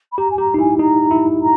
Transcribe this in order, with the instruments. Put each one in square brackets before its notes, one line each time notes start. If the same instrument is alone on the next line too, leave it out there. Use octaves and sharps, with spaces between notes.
[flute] B5
[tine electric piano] G4 [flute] A#5
[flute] G#5
[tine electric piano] G4 [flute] A#5
[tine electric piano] D#4
[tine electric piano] E4 [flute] G#5
[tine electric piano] D#4 [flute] A#5
[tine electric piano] E4
[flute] A#5